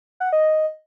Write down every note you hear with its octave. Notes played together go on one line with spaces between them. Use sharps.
F#5
D#5